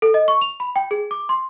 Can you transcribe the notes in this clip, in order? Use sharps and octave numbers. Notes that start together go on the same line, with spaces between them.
A4
D#5
C#6
F7
B5
G5
G#4
D6
C6